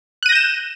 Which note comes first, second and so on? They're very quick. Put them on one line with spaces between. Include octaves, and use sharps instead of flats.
F#6 D#7 A#6 G6 E7